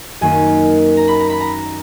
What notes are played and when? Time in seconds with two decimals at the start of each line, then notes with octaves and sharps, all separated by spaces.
0.21 F#2 D#3 A#3 C#4 G#5
0.97 A#5
1.08 B5
1.20 A#5
1.30 B5
1.41 A#5